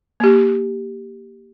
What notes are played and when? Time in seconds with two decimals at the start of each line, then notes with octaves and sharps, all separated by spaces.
0.20 A#3 G4